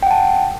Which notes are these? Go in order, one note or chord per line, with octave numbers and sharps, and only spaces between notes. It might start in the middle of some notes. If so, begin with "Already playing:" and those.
F#5 G5 A5